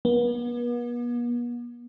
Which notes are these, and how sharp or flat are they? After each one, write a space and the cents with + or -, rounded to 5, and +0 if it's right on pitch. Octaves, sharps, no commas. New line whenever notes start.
B3 -40